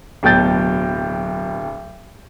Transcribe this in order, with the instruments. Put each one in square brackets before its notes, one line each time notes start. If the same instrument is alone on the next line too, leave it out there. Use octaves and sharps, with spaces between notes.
[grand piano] D1 B2 F#3 G5 G6 A6